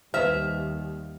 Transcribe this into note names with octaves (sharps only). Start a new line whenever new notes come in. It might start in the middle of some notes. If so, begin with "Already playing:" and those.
D#2 G3 B4 C5 E5 F6